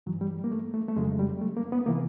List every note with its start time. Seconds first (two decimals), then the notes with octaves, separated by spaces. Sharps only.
0.06 G2 E3 F#3
0.21 G3
0.44 A#3
0.52 A3
0.74 A3
0.88 A3
0.96 F2 C#3 F#3 G#3
1.19 G3
1.42 A3
1.57 A#3
1.72 B3
1.86 C3 E3 A#3